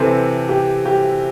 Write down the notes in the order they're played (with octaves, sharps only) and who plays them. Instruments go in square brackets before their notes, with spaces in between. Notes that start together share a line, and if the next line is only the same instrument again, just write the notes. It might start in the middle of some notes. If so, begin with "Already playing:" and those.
Already playing: [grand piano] C3 E3 C4 [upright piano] A4
[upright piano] G4
G4